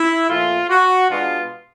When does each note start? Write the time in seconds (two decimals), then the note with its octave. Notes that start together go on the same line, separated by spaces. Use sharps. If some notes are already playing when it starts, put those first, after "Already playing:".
Already playing: E4
0.29 A#2 F3 A3 F4
0.69 F#4
1.10 B2 G#3 B3 D4 F4